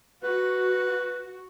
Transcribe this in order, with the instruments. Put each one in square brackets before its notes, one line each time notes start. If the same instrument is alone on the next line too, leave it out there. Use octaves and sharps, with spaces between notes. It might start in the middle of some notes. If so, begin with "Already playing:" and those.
[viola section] F#4 [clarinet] B4